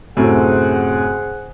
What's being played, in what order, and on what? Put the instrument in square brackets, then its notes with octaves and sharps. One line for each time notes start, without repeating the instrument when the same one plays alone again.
[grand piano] F#2 A2 C3 [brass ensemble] G#4 C5 F#5